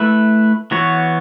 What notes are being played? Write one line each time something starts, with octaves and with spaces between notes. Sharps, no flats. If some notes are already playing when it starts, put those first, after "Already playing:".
Already playing: A3 E4 B4
E3 B3 F#4 C#5